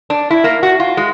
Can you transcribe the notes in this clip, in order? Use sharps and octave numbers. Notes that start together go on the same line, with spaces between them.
D4
E4
A#3
F#4
F4
G#3